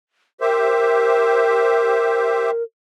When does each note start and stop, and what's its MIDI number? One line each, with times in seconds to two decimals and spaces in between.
0.41 2.51 67
0.41 2.63 70
0.41 2.51 72
0.41 2.51 76